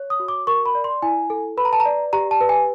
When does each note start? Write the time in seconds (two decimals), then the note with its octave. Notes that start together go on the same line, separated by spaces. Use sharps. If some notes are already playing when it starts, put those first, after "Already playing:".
Already playing: C#5
0.10 D#6
0.20 F#4
0.28 D6
0.47 A#4 C#6
0.66 B5
0.75 D5
0.84 C6
1.02 E4 G#5
1.30 A4
1.57 B4 B5
1.65 A#5
1.73 A5
1.80 A#5
1.85 D5
2.13 G4 A#5
2.31 A5
2.41 B4
2.49 G#5